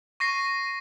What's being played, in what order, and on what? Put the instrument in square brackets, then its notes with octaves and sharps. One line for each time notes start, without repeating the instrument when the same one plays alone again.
[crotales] C#6 A#6 C7 D#7